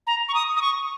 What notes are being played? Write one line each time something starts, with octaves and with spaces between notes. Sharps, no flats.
A#5
C#6
D#6
D#6
C#6